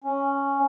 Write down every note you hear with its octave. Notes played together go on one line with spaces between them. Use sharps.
C#4